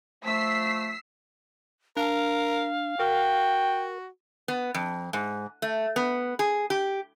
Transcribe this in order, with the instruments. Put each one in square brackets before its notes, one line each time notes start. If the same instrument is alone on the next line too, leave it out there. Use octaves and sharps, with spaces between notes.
[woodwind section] F3 A3 [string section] E6 B6 C7
[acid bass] D4 [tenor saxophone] A#4 [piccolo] F5
[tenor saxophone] F#4 [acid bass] A#4 [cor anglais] G5
[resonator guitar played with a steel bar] B3
F2
G#2
A3
B3
G#4
G4